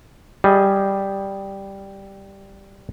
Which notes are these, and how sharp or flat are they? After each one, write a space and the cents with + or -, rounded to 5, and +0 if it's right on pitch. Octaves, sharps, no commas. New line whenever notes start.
G3 +0 G#4 +0 D#5 +30